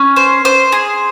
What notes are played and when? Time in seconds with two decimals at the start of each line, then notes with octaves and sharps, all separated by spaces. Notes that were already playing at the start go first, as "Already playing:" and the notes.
Already playing: C#4
0.16 C5
0.45 C5
0.72 G#4